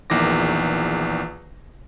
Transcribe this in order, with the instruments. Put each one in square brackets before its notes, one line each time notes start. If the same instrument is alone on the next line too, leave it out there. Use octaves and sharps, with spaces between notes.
[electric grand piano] A#1 E2 D#3 D6 A#6